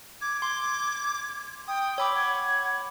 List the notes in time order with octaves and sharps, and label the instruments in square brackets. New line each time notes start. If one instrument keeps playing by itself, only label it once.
[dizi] D6 [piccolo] G#6
[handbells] C6 [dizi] D6
[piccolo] G5 [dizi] D#6
[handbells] C#5 B5 D6 [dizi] E6
[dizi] F#5 [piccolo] G#6